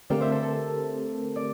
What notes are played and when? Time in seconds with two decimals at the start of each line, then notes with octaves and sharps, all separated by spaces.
0.10 D3 A3 C4 G4 A#4 D5 F5
0.20 C5 E5
0.32 A4 C5
0.42 A4
1.36 D5